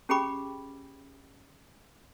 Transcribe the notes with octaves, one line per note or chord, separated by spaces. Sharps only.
C#4 G4 G#4 G5 B5 D6